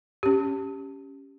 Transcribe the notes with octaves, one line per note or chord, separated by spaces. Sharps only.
C#4 G4